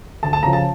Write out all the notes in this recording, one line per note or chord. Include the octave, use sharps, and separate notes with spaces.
D2 A5
A5
C#3 F3 A#5
A5